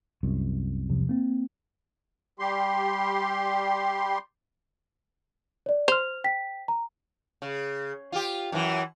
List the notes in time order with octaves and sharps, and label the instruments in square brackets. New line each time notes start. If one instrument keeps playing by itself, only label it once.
[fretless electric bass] C2 F#2
[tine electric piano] E2 C3 F3
A#3 C4
[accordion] G3 G4 C6
[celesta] C#5 D5
[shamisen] C5 [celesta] F6 F7
[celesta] G5 B6
A#5
[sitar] C#3
F4 G4
F#2 E3